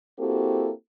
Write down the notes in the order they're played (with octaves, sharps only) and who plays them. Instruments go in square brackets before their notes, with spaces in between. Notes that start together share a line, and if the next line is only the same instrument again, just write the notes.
[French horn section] A#3 C4 E4 F#4 G4 A4